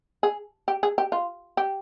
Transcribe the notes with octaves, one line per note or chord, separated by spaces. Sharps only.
G#4
G4
G#4
G4
F4
G4